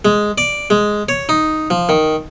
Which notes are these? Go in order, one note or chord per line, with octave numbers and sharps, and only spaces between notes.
G#3
D5
G#3
C#5
D#4
F3
D#3